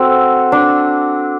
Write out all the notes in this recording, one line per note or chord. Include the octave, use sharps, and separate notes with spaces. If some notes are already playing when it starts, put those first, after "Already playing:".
Already playing: C4 F#4 A4
D4